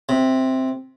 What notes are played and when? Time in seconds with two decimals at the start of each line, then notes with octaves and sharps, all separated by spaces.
0.09 C3